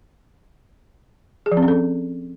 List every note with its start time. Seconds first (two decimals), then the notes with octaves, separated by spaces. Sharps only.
1.46 G#4
1.52 F3
1.57 C4
1.63 C#4
1.68 A4